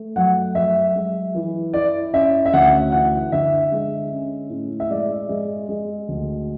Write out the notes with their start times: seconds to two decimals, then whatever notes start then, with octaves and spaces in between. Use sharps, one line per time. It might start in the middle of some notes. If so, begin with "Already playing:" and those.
Already playing: A3
0.16 F#3 F#5
0.55 F#3 E5
0.96 G#3
1.35 E3
1.74 E4 D5
2.13 C#4 E5
2.46 E5
2.53 D2 F#5
2.92 E3 F#5
3.32 D3 E5
3.72 G#3
4.11 C#4
4.50 A2
4.80 E5
4.90 G#3 D5
5.29 G#3
5.69 G#3
6.08 D2